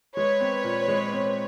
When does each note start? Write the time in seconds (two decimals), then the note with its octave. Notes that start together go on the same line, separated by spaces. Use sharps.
0.16 G#3 B4 C#5
0.41 C4
0.64 A#2
0.88 G#3
1.13 C4